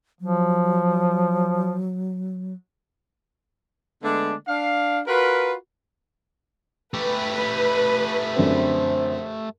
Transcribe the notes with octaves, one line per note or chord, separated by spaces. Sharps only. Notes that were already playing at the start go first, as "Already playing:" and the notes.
F3 F#3
D3 G#3 A3 B3 D4
D4 F5
F4 F#4 A#4 B4
A3 G4 B4 B5
F#2 D3 C4 C5